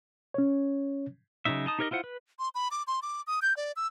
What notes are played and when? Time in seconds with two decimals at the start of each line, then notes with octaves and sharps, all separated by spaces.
0.34 C#4 C#5
1.45 C#3 F3 F#3 D#4 E5
1.66 D#4 A5 D#6
1.79 D#4 G4 A#4 C#5 D#5
1.91 E4 F4 C5 F#5
2.04 B4
2.39 C6
2.55 B5
2.71 D6
2.87 C6
3.02 D6
3.27 D#6
3.42 G6
3.57 D5
3.76 E6